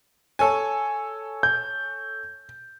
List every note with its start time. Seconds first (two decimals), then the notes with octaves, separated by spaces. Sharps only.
0.39 A4 C#5 G#5
1.43 G6